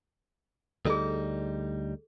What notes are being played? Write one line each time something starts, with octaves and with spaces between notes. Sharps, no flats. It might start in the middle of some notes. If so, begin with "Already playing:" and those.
D2 G3 D#4 G#4 A4